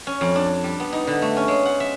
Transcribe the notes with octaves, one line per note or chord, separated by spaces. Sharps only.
C#4
F2
D4
G3
B3
D#4
D3
A3
C#4
G#3
F#5
E5